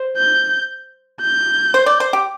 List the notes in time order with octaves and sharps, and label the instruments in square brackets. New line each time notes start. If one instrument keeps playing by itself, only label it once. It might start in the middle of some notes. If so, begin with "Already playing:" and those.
Already playing: [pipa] C5
[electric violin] G6
G6
[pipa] C5
D5
C5
G4